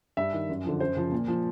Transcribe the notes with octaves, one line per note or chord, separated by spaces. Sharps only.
G2 E5
D#3
F#2
D3 F3
F#2 C5
C#3 F3
A#2
F3